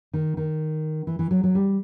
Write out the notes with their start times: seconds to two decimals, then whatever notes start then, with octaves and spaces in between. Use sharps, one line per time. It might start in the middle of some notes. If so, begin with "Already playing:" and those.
0.14 D#3
0.37 D#3
1.07 E3
1.19 E3
1.31 F#3
1.44 F#3
1.55 G3